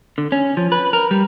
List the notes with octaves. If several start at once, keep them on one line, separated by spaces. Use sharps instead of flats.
D3
C#4
F3
B4
A#4
G3